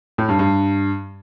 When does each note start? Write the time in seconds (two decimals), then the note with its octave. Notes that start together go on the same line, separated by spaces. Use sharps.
0.18 A2
0.29 G2
0.39 G2